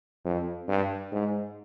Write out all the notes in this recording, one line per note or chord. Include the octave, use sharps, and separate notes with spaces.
F2
G2
G#2